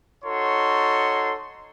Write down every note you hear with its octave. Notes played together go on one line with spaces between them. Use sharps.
D#4 F#4 A4 C#5 C6